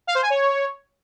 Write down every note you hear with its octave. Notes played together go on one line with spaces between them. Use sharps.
F5
C5
G#5
C#5